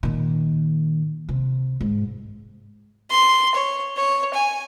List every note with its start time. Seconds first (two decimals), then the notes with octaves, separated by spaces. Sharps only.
0.03 A#2 D#3
1.29 C3
1.81 G#2
3.10 C6
3.55 C#5
3.97 C#5
4.34 G#5